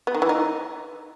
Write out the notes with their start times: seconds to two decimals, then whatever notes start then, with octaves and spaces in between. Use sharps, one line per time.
0.07 B3
0.15 D#3
0.22 E3
0.29 D#4